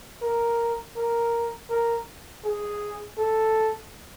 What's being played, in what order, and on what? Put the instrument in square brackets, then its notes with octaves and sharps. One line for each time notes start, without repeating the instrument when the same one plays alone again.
[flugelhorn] A#4
A#4
A#4
G#4
A4